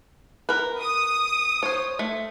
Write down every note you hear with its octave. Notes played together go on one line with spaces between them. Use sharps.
A#4 B4
D#6
C5 C#5
A3